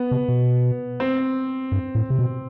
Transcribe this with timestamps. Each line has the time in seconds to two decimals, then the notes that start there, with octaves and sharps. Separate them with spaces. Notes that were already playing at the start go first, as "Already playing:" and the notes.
Already playing: B3
0.11 C3
0.28 B2
1.00 C4
1.72 G2
1.95 A2
2.10 C3
2.19 B2